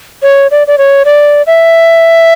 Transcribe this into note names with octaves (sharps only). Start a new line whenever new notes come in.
C#5
D5
D5
C#5
D5
E5